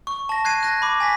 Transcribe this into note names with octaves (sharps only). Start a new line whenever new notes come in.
C#6
A5 A#6
F#6 G#6 C7 D#7
F#6 A#6
B5 D6
G#5 A#6 B6